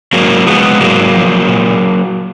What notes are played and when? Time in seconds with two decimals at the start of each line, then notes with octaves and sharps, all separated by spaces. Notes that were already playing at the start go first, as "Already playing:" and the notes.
0.13 G#2 F#3 A#3
0.46 F3 G#3 B3
0.80 G#2 F#3 A#3
1.14 F3
1.47 A#2